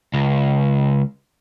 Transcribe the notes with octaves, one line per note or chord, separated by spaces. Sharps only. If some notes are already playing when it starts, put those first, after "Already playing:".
C#2